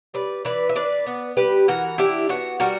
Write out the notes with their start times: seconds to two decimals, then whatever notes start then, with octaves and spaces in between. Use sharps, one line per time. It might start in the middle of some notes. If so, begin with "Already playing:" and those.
0.14 G3 B4 D5
0.45 E3 B4 D5
0.69 E5
0.75 D4 B4 D5
1.06 B3
1.37 G3 G4 B4
1.68 E3 F#4 A#4
1.98 D4 E4 G4
2.29 B3 F#4
2.60 G3 F#4 A#4